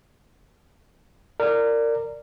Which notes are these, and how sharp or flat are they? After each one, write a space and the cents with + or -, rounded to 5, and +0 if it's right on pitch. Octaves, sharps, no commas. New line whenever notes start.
A#4 -20 D5 +0